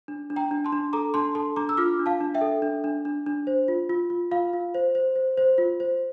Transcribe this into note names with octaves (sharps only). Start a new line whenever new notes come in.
D4
D4
G5 A#5
D4
A5 C6
D4
A4 A#5 D6
D4 A5 C6
A4 A5 C6
D4 A#5 D6
E6
F4 D6 F6
D4
F5 A5
D4
E5 G5
A4
D4
D4
D4
D4
C5
F4
F4
F4
F4 F5
F4
C5
C5
C5
C5
F4
C5